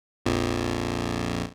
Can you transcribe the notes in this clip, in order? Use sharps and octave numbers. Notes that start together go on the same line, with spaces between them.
A#1 F2